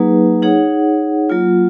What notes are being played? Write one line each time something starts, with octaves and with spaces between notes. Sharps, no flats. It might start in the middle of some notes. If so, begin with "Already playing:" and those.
Already playing: F#3 A#3 D#4 G#4 B4
D#4 G#4 C#5 F#5
F#3 A#3 F4